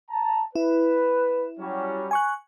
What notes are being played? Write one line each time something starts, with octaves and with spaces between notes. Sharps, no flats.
A5 A#5
E4 B4
F#3 G3 C#4
G#5 C#6 F#6